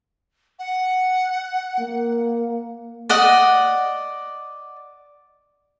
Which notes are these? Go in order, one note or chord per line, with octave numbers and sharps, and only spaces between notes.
F#5
A#3
D5 D#5 F#5